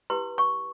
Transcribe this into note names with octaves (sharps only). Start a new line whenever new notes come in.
E4 G4 B4 C6
C#6